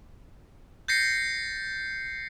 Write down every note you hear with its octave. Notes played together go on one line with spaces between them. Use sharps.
G6 A6 A#6 C7 C#7